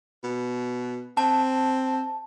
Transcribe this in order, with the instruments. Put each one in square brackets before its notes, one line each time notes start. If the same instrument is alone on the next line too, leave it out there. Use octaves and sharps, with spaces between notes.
[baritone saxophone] B2
[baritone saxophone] C4 [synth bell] A5